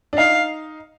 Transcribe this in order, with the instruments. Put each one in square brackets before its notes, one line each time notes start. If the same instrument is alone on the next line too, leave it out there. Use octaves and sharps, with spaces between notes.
[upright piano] D4
[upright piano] D#4 [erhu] F5